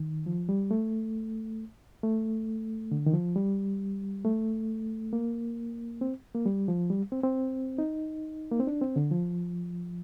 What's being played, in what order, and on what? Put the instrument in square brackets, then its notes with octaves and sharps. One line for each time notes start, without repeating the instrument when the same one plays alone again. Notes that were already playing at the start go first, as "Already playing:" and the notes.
Already playing: [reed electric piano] D#3
F3
G3
A3
A3
D3
D#3
F3
G3
A3
A#3
C4
A#3
G3
F3
G3
C4
C4
D#4
A#3
C4
D4
C4
D3
F3